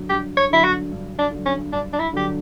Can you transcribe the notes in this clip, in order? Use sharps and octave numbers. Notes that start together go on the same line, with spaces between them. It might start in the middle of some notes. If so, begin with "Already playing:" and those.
Already playing: D3 F#3
G2 G4
C#5
D3 F#3 E4
F#4
G2
D4
D3 F#3
C#4
G2 D4
D4
E4
D3 F#3 G4